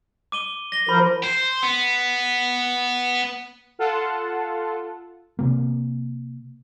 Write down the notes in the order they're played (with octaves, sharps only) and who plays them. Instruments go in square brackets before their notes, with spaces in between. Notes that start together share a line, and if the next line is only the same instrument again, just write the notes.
[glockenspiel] D6 D#7 G7
A#6 G7
[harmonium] F3 A#4 C5 [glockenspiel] B5
[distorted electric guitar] C5
B3
[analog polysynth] F4 A4 F#5 A5
[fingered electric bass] C3 A#3